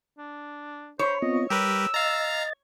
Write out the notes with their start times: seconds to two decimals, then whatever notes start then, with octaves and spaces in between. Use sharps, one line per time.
0.18 D4
0.99 C5 C#5 B5
1.22 B3 C4 F4 D#5
1.50 G3 G4 A#4 B4 E6
1.94 D#5 F5 A#5 A6